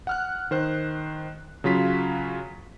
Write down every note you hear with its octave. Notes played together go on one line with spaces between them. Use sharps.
F#5 F6 F#6
D#3 C5 F#6
C#3 F#3 F4 B6